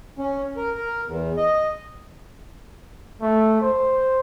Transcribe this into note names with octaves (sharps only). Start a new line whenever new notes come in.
C#4
A#4
A#4
E2
D#5
A3
C5